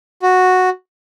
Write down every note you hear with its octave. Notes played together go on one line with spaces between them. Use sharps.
F#4